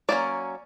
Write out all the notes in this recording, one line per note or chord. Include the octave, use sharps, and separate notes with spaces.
F#3 A#3 C#4 D5